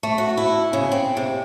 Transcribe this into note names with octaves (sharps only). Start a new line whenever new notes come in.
A3
F#4
E4
C#3
C4
C3